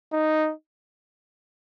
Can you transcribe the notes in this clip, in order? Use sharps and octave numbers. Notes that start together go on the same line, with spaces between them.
D#4